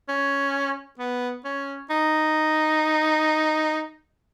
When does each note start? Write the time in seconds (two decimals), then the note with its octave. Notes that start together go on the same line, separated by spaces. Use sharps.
0.08 C#4
0.99 B3
1.45 C#4
1.90 D#4